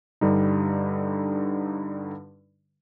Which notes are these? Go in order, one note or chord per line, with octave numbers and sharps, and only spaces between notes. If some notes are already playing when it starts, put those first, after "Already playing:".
G2 D3 G3 D#4